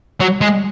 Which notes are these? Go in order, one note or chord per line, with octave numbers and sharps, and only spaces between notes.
F#3
G#3